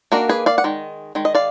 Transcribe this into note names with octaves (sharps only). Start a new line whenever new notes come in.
D#3 A#3 D4 F#4 A#4
G#4 B4
D5 F5
F#5
D#3 G#3
D#3 G#3
D#5
D5 F5